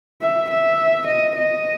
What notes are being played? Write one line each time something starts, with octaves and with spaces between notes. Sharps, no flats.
E5
E5
D#5
D#5